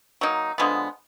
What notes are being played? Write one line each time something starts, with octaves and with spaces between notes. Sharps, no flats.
F#3 A#3 D#4
D3 F3 G#3 B3